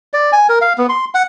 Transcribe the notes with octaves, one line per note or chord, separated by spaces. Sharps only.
D5
G#5
A#4
F5
B3
C6
F#5